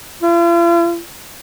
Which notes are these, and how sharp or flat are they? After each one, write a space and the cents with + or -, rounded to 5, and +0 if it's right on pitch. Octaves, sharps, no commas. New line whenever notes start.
F4 -45